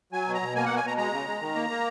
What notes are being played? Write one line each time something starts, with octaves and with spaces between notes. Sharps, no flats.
F#3 G#5
B2
A#5
B2
A#3 G#5
B2 F#5
G#5
B2 A#5
G#3 A#5
C#3
G#3
D#3
A#3
A#3